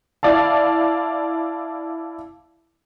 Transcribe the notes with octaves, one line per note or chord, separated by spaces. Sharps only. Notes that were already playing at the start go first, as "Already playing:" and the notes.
E4 D5 F5 A5